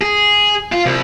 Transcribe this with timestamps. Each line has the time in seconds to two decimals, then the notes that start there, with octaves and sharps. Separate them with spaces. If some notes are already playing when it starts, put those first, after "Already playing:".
0.01 G#4
0.72 F4
0.86 C2